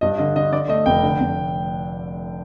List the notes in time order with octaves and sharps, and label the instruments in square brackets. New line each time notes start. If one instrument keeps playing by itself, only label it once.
[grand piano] G2 D#5
D3 D#5
D3 D#5
D3 D5
A3 D#5
F1 G5
D3
F1